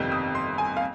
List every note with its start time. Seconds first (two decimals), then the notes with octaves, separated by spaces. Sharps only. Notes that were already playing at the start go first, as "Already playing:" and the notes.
Already playing: G1 F2 C3 D#3 G3 G6
0.12 D#6
0.35 C6
0.58 G#5
0.77 F5